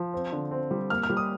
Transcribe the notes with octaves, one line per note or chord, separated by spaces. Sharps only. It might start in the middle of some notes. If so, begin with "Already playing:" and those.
Already playing: F3
C4
D3
C4
G3
A#3 F6
F6
G3
D#6